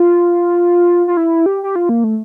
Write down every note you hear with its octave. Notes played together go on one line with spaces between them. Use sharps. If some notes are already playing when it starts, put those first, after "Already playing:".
Already playing: F4
F4
E4
G4
G4
F4
A#3
A3